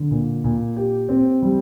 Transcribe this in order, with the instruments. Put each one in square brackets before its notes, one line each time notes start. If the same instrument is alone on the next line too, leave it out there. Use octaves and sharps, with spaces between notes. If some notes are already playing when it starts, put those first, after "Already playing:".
Already playing: [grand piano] D3
A#2
A#2
G4
C4
G3